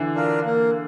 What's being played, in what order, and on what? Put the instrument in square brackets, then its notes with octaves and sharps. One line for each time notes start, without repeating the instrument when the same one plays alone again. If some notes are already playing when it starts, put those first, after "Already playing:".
Already playing: [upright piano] D3 E3
[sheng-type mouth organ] D4 F4 A#4
A#3